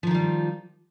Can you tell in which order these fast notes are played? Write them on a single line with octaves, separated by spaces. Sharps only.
F3 D#3 F4 G3